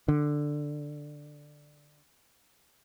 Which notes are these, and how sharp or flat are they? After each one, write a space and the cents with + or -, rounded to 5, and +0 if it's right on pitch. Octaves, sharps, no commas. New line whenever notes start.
D3 +5